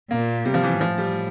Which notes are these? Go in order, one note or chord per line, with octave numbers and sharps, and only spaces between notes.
A#2 A#3
C3 G3
F3
E3
A2 F3
G3